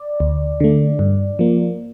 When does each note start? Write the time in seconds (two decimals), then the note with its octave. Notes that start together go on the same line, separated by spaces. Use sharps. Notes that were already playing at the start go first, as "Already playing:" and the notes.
Already playing: D5
0.20 D2
0.60 D3 A3
0.99 G2
1.39 F3 A#3